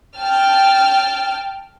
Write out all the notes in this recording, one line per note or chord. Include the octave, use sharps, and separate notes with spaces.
G5 A5 F6